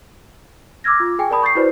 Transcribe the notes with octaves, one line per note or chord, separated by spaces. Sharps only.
D6 E6 F6 G#6 A#6
F4
G#4 G5 G#5
A#4 D5 A5 B5 D#6
C#6 G6 A6 C7
E4 F#4 B4 C5 D5